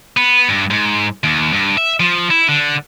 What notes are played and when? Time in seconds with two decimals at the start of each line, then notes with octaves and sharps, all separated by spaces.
0.17 B3
0.49 G2
0.71 G#2
1.24 D#2
1.53 G2
1.77 E5
2.00 F3
2.30 E4
2.49 D3